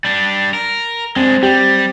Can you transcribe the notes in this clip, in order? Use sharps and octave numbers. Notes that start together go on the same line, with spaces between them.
G3 D4
A#4
G#3 C4 D4
G3 G4